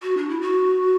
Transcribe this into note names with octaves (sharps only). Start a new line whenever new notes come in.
F#4
D4
E4
F#4